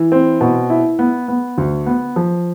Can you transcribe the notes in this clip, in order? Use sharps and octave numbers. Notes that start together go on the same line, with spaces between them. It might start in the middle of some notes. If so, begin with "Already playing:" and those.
Already playing: E3
C4
B2
E4
B3
B3
D2
B3
F3